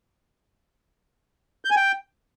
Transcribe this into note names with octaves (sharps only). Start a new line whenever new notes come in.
G6
G#5
G5